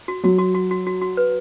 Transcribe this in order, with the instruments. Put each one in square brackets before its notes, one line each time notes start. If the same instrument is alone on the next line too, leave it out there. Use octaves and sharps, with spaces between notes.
[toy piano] F#4
[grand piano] F#3 [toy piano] F#4
[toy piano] F#4
F#4
F#4
F#4
F#4
B4